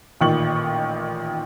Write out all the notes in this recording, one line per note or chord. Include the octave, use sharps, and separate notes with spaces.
A1 A#2 D#3 C#6 F#7